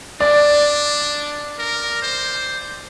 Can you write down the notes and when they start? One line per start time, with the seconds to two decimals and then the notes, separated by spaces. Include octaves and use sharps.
0.20 D4 D5
1.59 A#4
2.03 C5